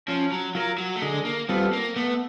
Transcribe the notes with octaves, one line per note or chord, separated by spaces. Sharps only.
F3 C#4
F#3
F#3 F4 A#4
F#3
A3
D3 G#3
A#3
G3 B3 C4 F4 A4
A#3
A3 B3